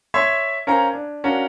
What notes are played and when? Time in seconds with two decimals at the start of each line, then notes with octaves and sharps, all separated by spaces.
0.14 C#5 E5 C6 G#6
0.67 C#4 A#4 C5 F5 G#5 A#5
0.93 D4
1.24 C#4 D4 F#4 A#4 F5